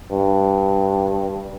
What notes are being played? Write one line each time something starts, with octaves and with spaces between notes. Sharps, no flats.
G2